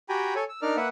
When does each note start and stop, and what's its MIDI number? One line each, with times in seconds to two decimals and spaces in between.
0.09 0.34 66
0.09 0.34 67
0.09 0.34 79
0.09 0.34 80
0.09 0.34 82
0.09 0.34 83
0.35 0.44 69
0.35 0.44 73
0.35 0.44 80
0.49 0.60 88
0.62 0.76 62
0.62 0.76 63
0.62 0.76 70
0.62 0.76 74
0.62 0.76 89
0.77 0.88 58
0.77 0.88 71
0.77 0.88 76
0.77 0.88 78